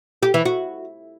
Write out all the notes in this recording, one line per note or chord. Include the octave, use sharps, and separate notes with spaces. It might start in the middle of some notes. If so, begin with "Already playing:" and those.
G4
E3
F#4